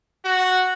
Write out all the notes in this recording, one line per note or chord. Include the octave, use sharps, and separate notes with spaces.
F#4